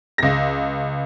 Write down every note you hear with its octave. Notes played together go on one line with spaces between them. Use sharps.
C#2 A#6